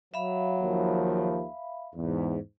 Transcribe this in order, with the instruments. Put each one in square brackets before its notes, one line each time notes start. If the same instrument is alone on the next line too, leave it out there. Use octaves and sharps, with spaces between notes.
[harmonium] F#3 [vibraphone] E5 F5 B5
[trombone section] D#2 D#3 F3
[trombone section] E2 [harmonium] G#2